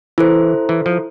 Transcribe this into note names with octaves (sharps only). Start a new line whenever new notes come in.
E3 E4 A4 C5
E3
F3